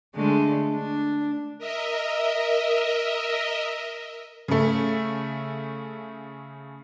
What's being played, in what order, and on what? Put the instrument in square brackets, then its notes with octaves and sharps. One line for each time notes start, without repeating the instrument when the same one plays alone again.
[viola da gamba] D3 G#3 A3
D4
[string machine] A#4 D#5 E5
[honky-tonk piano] C#3 A3